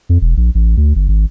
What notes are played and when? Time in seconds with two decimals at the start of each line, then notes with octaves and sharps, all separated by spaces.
0.09 F2
0.21 E1
0.37 A#1
0.55 A1
0.77 D2
0.96 G1
1.08 G#1